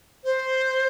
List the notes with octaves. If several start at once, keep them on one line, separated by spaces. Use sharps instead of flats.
C5